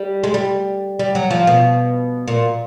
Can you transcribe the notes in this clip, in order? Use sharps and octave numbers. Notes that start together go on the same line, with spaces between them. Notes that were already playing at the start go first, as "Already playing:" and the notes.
Already playing: G3
G#3
G3
G3
F#3
F3
B2
A#2